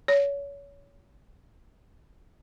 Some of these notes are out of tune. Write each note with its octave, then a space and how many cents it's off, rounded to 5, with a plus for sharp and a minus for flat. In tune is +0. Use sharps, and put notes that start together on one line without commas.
C#5 +30